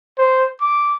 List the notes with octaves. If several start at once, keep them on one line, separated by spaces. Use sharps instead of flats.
C5
D6